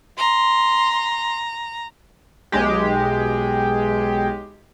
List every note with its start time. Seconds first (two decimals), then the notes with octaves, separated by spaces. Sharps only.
0.18 A#5 C6
2.52 B1 G#3 G4